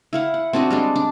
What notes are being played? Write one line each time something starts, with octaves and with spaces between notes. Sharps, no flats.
E4 F5 F#5
F#5
C4 D4 F#4 D#5
G3 G#3 D4
D4